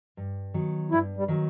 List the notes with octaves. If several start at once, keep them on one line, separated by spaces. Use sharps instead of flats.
G2
D#3 F#3 B3
G2 E4
G3
D#3 F#3 B3